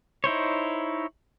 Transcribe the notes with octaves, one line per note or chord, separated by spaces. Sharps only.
D#4 E4 C5 C#5